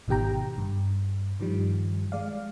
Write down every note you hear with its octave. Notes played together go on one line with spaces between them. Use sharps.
G#1 B2 D#3 G4 G5 A#5
G2
G2 D#3 F3 G3
G#3 D5 F5